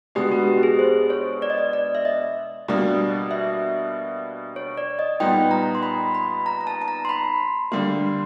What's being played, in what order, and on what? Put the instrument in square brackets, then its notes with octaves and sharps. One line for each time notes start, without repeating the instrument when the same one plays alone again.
[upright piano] B2 G#3 B3 D4 [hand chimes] G4
[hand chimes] F#4
G4
G#4
C5
C#5
D5
D#5
D5
D5
E5
D#5
[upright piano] B2 G3 A#3 D4
[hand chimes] E5
C#5
D5
D#5
[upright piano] A#2 G3 B3 D#4 [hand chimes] G5
[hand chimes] A#5
C6
B5
B5
A#5
A#5
A5
A5
A#5
C6
B5
[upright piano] D3 G3 A#3 [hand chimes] C6